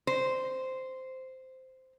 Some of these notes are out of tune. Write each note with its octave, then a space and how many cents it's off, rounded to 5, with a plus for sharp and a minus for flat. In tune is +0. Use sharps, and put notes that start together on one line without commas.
C5 -10